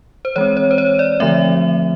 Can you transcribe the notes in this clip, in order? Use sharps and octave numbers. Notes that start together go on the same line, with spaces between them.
C5
E3 G#3 C4 C#5
C#5
C5
C#5
D5
D3 F3 A3 C4 E5